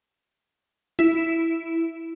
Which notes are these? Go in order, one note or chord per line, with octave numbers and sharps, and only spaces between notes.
E4